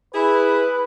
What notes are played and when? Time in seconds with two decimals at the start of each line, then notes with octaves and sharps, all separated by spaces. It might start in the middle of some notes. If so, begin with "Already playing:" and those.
0.14 E4 G#4 B4